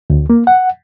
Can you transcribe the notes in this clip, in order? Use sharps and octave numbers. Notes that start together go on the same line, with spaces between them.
D2
A#3
F#5